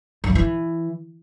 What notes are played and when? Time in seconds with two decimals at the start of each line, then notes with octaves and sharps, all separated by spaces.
0.24 F#2
0.30 C#3
0.35 E3